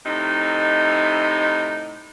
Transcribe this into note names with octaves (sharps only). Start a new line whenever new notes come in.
A2 C3 D#4